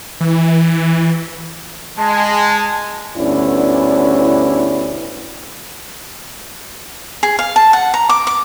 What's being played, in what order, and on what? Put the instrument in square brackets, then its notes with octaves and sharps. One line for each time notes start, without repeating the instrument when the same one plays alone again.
[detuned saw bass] E3
[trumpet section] G#3 [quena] A5
[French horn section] D2 G2 B3 C#4 E4 D5
[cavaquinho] G#4
F5
A5
F#5
A#5
D6
D6